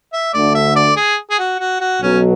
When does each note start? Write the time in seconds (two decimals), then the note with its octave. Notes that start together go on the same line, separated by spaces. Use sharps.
0.13 E5
0.33 D2 D3 A3 D5
0.55 E5
0.76 D5
0.96 G#4
1.30 G#4
1.39 F#4
1.59 F#4
1.80 F#4
2.02 B1 B2 F#3 C#4